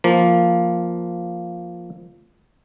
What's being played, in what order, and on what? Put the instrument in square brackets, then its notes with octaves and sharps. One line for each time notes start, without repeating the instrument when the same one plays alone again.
[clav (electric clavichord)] F3 A#3